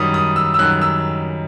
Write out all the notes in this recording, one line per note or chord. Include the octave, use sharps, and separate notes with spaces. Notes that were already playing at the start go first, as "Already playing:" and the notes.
Already playing: F#2 D#3 G3 D#6
D#6
E6
E6
F#2 D#3 G3 F#6
E6